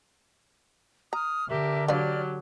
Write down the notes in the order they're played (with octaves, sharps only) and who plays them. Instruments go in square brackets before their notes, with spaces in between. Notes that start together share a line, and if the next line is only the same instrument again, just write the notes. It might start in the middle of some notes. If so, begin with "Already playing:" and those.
[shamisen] A#5 [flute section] D#6 F6
[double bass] D3 [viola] G4 [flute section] A#4 E5
[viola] F#3 G4 [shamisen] D4 B4 F5 [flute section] C#5 D5 F6